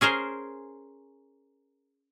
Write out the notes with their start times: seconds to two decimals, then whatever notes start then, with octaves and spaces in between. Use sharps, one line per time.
0.01 C#4 G#4 A#4 C5